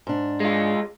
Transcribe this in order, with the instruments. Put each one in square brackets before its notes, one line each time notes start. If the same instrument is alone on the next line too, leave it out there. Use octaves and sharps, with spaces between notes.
[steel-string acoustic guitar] G#2 D4
[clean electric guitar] G#3 F4